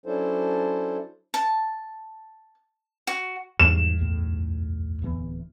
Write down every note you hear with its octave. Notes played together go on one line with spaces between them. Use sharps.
F#3 C#4 D4 E4 A4 C5
A5
F#4
E2 G#2 D#3 G3 E7
B1 F#2 A2
D1 E3 B3